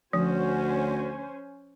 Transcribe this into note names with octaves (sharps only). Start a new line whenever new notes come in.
D2 F3 C#4 F#4 C5 G#5